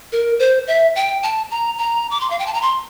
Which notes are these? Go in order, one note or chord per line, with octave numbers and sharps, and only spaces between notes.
A#4
C5
E5
G5
A5
A#5
A#5
D6
C6
F5
G5
A5
A#5
C6